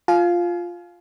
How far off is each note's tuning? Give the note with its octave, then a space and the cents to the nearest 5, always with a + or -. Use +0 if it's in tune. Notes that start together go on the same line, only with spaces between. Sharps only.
F4 +0 F5 +0 G#5 +40